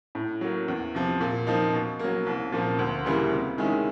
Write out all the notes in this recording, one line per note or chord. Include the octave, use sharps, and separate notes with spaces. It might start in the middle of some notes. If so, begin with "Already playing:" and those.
A2
F#3 A#3
E2
C3 F3
A#2
F3 A#3 D#4
B2
A#3
F#3
C2
A#2 F3 A#3
D2
C#3 E3 G3 A#3
C3
D#3 G#3 C#4 E4